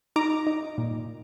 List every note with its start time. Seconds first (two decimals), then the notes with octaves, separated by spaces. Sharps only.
0.16 D#4 A#5 D6
0.47 D#4
0.78 A#2